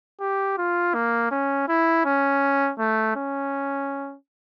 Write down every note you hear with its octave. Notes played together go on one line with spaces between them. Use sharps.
G4
F4
A#3
C#4
E4
C#4
A3
C#4